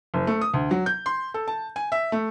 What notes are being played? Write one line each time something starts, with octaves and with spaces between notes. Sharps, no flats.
F#1
A3
D#6
D2
F#3
G6
C6
A4
A5
G#5
E5
A3